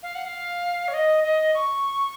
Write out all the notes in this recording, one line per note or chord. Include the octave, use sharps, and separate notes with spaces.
F5
F#5
F5
C#5
D#5
D#5
C#6